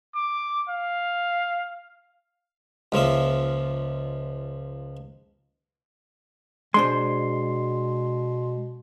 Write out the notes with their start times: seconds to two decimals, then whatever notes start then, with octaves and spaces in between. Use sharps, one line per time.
0.15 D6
0.69 F5
2.92 C#2 F3 A#3 E5
6.74 B2 G#3 D4 C5 C6